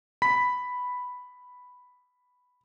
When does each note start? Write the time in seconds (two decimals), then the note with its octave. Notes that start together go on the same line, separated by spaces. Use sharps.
0.22 B5 B6